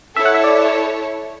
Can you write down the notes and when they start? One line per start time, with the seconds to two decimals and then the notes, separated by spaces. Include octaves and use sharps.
0.17 E4 A4 C#5 E5
0.25 F#5
0.34 E5
0.44 D5